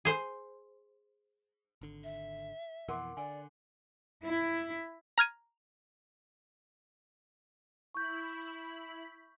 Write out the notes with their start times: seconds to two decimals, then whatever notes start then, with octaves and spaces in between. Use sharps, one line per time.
0.05 G#4 C5
1.81 G#1 D3
2.04 E5
2.88 F2 B2 E3 A#4 F#5 C6 D6
3.17 D3 D5 G#5
4.23 E4
5.18 A#5 F6 G#6 D#7
7.95 E4 B5 C#6 G6